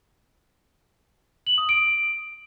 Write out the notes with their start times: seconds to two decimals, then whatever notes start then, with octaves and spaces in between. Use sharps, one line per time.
1.47 F#7
1.58 D#6
1.69 D7